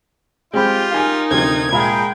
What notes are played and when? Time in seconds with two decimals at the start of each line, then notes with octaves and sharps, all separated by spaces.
0.54 G#3 C4 F4 G4 G5 B5
0.91 D#4 A#4 F5 G#5
1.31 D2 C3 F3 G#6
1.72 A#2 G#3 G#4 A#4 E5 G5 B5